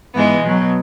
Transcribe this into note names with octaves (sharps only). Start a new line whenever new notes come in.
G#2 E3 G#3 B3
B2 F#3